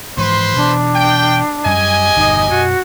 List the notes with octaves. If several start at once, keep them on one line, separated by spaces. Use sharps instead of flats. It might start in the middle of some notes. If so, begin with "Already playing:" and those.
G#2 E3 F3 B4 C5 C6
B2 E3 D4
G5
F#2 G3 C#4 G4 D#5 G#5
G1 E2 B2 D#4
F#2 B2 F#4